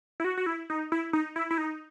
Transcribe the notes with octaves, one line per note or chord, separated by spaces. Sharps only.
E4
F#4
F#4
E4
D#4
E4
D#4
E4
E4
D#4